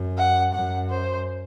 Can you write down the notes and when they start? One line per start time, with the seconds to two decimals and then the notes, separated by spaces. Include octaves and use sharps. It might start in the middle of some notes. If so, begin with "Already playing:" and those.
Already playing: F#2
0.17 F#5
0.54 F#2 F#5
0.90 C5